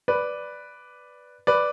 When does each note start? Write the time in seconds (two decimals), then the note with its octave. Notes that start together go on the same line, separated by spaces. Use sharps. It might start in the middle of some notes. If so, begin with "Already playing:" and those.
0.08 B4 D5
1.47 B4 D5